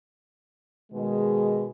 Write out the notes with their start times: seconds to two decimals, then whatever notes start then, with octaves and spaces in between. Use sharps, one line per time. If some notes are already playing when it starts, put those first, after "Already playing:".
0.92 B2 D#3 G#3